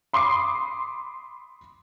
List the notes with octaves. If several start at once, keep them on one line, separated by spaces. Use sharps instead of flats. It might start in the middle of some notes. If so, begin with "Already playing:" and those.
B5 C6 D6 D#6 C7